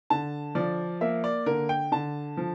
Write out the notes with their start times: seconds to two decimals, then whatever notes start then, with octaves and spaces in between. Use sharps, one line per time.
0.10 D3 A5
0.55 F3 D5
1.01 A#3 E5
1.24 D5
1.46 D3 A#4
1.69 G5
1.92 D3 A5
2.37 F3